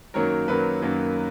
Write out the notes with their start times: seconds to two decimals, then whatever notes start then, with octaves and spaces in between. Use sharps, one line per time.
0.14 F#2 D#3 F#3 A#3 A#4 C#5
0.48 F#2 D#3 F#3 A#3 B4
0.82 F#2 D#3 F#3 A#3